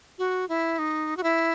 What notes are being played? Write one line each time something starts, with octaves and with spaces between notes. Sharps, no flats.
F#4
E4
D#4
F#4
E4